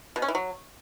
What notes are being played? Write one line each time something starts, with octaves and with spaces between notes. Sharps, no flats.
B2
C#4
E3
F#3